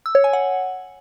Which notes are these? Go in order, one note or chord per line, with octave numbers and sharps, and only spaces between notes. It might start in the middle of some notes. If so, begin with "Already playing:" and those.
E6
C#5
G#5
F#5